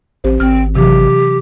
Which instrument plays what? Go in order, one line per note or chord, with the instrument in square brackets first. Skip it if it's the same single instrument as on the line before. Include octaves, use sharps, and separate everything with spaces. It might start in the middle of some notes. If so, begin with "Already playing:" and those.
[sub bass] A1 [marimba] C4 G4 C5
[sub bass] G#1 [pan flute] C4 [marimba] F6
[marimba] C3 E3 F#3 [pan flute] G4